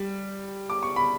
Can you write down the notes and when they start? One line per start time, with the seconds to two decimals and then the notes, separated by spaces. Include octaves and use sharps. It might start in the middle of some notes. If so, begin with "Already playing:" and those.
Already playing: G3
0.70 D6
0.83 C#6
0.96 B5